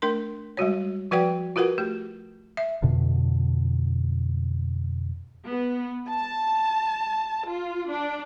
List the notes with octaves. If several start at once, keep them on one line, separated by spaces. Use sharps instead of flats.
A3 D4 A#4 C6
G3 G#3 F#4 C#5
F3 F#4 B4 D5 F#5 G5
F4 F#4 A#4 B4 F#5
A3 G4
E5
F2 B2 D3
B3
A5
F4
D4